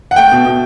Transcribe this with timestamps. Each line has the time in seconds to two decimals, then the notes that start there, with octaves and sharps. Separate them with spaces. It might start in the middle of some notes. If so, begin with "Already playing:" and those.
0.11 F#5
0.16 A3 G5
0.32 B2
0.45 B2